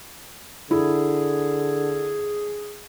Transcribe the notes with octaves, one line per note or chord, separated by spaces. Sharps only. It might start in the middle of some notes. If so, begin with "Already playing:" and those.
D3 E4 G#4